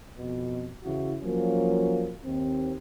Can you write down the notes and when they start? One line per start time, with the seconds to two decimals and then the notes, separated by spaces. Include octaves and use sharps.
0.19 F2 B2
0.84 C#3 E3 E4 F#4
1.21 F3 F#3 A#3 C#4
2.25 D#2 C4